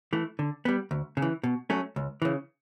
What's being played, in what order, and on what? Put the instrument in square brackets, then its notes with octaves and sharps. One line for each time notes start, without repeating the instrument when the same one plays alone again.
[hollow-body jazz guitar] E3 A3
D3
G3 B3
D2
C#3
E3
B2
F#3 A3 C#4
C#2
C#3 E3